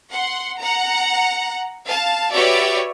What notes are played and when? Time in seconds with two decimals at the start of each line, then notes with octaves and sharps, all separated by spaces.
0.11 F#5 C6
0.59 F#5 A#5
1.86 F5 A5
2.33 F#4 G4 B4 C#5 D5 E5